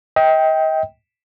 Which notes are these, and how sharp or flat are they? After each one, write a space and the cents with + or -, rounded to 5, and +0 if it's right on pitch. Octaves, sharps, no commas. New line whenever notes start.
D#5 +35 G5 +0